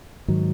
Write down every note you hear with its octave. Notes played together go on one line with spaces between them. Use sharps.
G#2 D#3 F#3